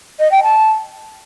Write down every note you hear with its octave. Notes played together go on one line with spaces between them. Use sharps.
D#5
G5
A5